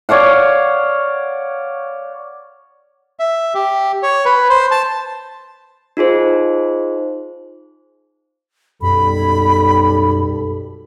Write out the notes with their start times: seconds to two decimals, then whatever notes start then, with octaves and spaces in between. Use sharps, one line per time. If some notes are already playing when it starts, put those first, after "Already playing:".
0.09 C#5 D5 F5 F#5
3.19 E5
3.54 G4
4.03 C#5
4.25 B4
4.49 C5
4.71 A5
5.97 D#4 F4 G#4 C5
8.82 B1 F#2 G3 A4 B5